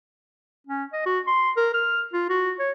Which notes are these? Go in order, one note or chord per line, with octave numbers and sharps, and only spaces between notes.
C#4
D#5
F#4
C6
A#4
F6
F4
F#4
C#5